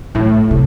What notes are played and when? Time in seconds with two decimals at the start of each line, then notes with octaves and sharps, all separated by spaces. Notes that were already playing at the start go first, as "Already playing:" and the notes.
0.15 A2 E3
0.51 C3